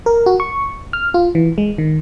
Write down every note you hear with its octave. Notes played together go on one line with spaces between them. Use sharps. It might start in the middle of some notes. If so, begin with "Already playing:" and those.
A#4
F#4
C#6
F6
F4
E3
G#3
D#3